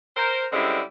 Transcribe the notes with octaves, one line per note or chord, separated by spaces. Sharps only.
A#4 C5
D3 G3 G#3 C4 C#4 E4